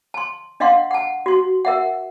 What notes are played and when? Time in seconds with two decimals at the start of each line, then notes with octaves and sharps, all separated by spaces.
0.14 A5 C6
0.60 D4 D#5 F5 F#5 C6
0.91 F#5 A5
1.26 F#4 C6
1.65 A#4 E5 F#5